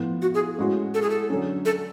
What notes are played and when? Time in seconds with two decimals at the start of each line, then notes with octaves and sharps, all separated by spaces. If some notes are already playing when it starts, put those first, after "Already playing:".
Already playing: A2 F3 B3 F4
0.22 F#4
0.34 G#4
0.58 A2 G#3 C#4 F#4
0.94 A4
1.02 G#4
1.10 A4
1.30 D3 F#3 C#4
1.65 A4